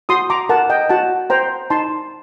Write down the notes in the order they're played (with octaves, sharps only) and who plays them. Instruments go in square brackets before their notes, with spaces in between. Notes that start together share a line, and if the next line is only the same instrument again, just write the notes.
[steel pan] F#4 C6 D#6
A#5 D6
A#4 F#5 A5
D#5 G5
F#4 F#5 A5
C5 G5 A#5
D#4 A5 C6